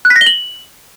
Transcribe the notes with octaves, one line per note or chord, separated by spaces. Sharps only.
F#6
B6
A#6
G7
F#7